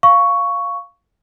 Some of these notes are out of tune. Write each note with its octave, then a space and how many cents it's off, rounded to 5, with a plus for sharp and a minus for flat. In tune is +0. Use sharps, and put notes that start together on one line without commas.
F5 +0 C#6 +10